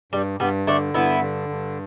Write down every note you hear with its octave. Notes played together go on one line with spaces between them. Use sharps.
G2 G3
G2 G3 B3
D3 A3 D4
G2 B3 E4
D3
G2